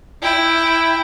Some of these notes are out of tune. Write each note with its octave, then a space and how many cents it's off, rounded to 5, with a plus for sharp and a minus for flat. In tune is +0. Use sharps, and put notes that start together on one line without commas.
E4 +0 G5 +10